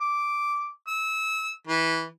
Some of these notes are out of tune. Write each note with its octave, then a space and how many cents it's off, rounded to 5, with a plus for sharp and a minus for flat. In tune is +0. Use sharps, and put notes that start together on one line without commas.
D6 -5
E6 -25
E3 -15